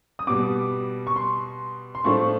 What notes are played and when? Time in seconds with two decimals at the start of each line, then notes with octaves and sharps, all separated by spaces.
0.19 D#6
0.27 B2 G3 B3 D6
1.07 C#6
1.16 C6
1.95 C6
2.04 A2 F3 A3 D4 C#6